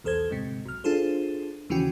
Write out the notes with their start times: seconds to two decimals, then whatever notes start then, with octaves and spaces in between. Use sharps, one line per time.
0.04 B1 E2 A4 C5 G#6
0.30 D2 G#2 C3
0.66 B1 F6
0.84 D4 F4 G#4 A4 C5
1.70 D#2 C#3 E3 C#4 F#4 G5